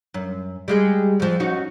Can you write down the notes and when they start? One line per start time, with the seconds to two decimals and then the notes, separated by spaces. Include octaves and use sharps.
0.14 F#2
0.68 G3 G#3 G#4
1.20 F2 F3
1.40 C#4 D#4 F#4